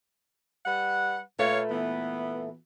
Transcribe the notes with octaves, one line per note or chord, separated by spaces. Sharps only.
G3 B4 F#5
A#2 A3 B4 C#5 F5
E3 B3